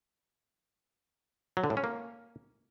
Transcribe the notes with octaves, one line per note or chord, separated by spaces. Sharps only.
F#3
D3
A2
C#4
A#3